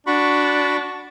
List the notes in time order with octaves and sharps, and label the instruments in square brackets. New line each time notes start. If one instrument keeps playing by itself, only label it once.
[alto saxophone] D4 [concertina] F#4 B5 C#6